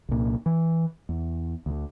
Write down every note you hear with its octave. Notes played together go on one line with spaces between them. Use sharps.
C2 A#2
E3
E2
D2 D3